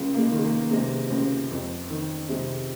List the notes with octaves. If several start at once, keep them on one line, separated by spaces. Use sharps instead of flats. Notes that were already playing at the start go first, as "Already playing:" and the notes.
Already playing: C#2
A#3
G#3
D#3
G#3
A#3
C3 G#3
C#2
F2
D#3
C3 G#3